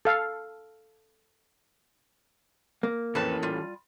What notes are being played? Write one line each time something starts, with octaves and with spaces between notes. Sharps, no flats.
A4 F5
A#3
F2 E3 C#4 A4 B4 A5
G3 F4